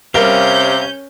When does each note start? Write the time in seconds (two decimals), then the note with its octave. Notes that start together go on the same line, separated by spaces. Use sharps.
0.14 C3 G3 C#4 A#4 F5 G6 G7